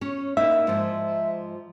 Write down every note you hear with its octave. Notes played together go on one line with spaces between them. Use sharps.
C#4 C#5
A#3 D#4 E4 E5
G#2 F3